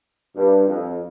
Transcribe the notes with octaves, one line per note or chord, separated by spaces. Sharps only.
G2
F2